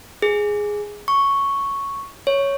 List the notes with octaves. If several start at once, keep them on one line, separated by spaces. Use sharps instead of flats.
G#4
C#6
C#5